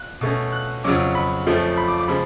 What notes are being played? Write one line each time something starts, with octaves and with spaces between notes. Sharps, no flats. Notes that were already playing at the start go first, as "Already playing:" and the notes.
Already playing: F#6
B2 A3 C#4
F#6
F2 C#3 F#3 C#4 D6
B5
F2 F3 A3 C#4
B5
D6
D6
C#3 F3 G#3 B5